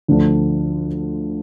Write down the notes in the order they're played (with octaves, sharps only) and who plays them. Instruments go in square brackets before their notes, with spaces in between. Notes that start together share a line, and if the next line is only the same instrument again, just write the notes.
[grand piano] D2 D3 F3 A3 D4